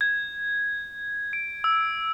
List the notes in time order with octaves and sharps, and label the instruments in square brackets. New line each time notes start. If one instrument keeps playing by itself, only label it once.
[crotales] G#6
D7
E6